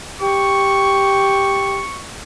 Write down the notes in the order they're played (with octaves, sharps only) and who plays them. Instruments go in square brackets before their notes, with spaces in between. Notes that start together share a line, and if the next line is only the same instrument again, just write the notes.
[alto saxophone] G4 [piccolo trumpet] C#6